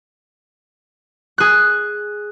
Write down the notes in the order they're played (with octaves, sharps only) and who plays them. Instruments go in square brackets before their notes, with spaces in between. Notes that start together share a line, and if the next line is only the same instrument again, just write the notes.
[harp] G#4 F#6